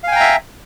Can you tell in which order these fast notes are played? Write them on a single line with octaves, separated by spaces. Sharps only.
F5 G#5 G5 A#5 E5